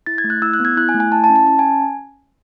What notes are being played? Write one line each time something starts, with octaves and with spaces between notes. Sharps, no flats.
E4 A6
G#6
A3
F#6
E4 E6
F#6
B3
G#6
E4 F#6
G#5
A3
G#5
E4 A5
A5
C#4
A5
C#4 A5
G#5